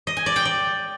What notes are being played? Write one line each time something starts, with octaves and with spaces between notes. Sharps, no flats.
D#5
G#5
D5
G5
D5